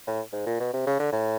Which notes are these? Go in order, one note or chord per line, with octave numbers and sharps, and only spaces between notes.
A2
G#2
A#2
B2
C3
C#3
D3
A2